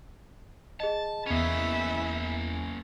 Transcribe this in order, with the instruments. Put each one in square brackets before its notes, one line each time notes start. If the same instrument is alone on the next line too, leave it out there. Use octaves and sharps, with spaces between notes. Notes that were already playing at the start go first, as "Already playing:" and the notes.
[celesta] G#4 D#5 [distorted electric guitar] A5
[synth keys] E2 G#5 [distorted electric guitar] A#3 C#4 [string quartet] B4 E5